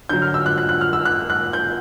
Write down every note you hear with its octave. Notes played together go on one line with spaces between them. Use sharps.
D3 F#3 G6
F6
E6
F#6
F#6
F#6
F6
E6
F#6
F#6
G6